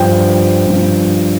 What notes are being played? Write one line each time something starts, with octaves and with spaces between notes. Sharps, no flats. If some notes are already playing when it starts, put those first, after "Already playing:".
Already playing: G2 F3 G5
G2 F3